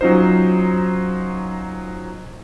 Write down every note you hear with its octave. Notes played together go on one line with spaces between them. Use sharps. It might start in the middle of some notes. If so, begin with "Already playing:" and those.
F#3 C#4 D#4 F4 C5